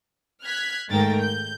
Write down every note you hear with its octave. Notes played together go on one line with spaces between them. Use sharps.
F6 F#6 G#6 B6
G#2 D#3 A3 A#4 G5 A6
G6